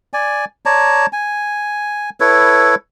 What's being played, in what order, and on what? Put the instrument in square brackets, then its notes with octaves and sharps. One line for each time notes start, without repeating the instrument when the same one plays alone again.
[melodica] D5 G#5
C#5 D5 A5 A#5
G#5
E4 A4 B4 C#5